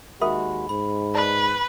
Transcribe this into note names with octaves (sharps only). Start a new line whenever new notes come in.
D#2 G#3 F#4 A#4 E5 B5 D#6
G#2 B5
B4 D5 A5